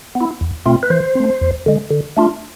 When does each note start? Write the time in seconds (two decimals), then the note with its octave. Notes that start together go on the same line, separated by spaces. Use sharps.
0.15 B3
0.21 E4
0.41 E2
0.66 B2 A3 C4 F4
0.83 B4
0.90 E3 C5
1.15 A3 C4
1.41 E2
1.66 D3 G#3
1.91 D3
2.17 A3 D4 F4